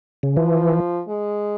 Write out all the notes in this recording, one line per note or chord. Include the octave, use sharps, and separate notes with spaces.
C#3
E3 F3
G#3